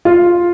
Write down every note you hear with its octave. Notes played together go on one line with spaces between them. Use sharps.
F4